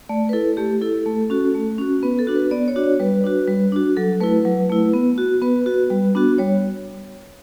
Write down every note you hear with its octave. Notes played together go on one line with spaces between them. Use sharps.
A3 D5
B4
E4 A4
A3 G4
E4 A4
A3
C#4 F#4
A3
C#4 F#4
B3 B4
A4
D4 F#4
B4
B3 D5
C#5
D4 F#4 D5
C#5
G3 B4
D4 F#4
G3
D4 F#4
F#3 A4
A3 E4 B4
F#3
A3 E4
B3
F#4
B3 B4
F#4
G3
B3 D4 F#4
G3 C#5